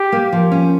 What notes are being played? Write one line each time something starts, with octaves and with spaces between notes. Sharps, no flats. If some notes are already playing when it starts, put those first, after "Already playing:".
Already playing: G4
A#3
F3
C#4